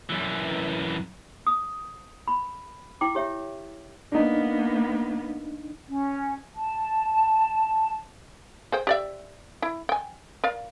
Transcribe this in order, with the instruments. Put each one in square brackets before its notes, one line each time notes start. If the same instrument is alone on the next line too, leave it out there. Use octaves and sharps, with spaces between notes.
[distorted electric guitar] F#2 E3
[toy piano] D#6
B5
E4 G5 D6
G4 C#5 E5
[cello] A#3 B3 [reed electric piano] D4 D#4
[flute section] C#4
A5
[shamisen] G#4 C5 G5
G4 D5 E5
E4
G5 G#5
A#4 D5 F5